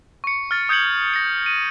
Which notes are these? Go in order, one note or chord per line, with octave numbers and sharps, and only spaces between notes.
C#6 C#7
F6 A6
D#6 G6 G#6 C#7 F#7
A#6 C#7
D#7